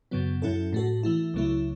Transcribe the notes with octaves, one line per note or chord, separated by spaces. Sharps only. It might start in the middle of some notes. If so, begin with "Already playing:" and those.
F#2 C#3 F#3 B3
F#2 F#3 C#4 E4 A4
A2 A3 F#4 A4
E3 A3 E4
C#2 C#3 F#3 A3 E4